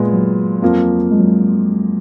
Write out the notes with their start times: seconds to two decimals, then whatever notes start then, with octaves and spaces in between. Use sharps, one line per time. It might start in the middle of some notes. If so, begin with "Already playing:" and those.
Already playing: A#2 G#3 B3
0.13 F#3
0.62 F2 F3 A#3 F4
1.11 G#3
1.19 F#3
1.28 G#3